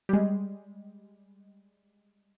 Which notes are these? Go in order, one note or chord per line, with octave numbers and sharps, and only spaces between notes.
G3 G#3